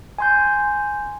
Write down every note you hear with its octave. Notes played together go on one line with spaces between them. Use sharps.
G#5 C6 G6